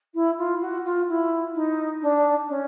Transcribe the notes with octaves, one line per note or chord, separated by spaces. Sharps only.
E4
F4
F#4
F4
E4
D#4
D4
C#4